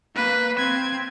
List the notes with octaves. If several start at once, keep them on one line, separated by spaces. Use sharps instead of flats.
A#3 B4
C4 G#6